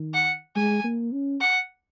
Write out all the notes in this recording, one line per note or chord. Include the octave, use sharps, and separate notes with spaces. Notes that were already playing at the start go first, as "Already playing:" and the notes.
Already playing: D#3
F#5
G#3 G#5
A#3
C#4
F#5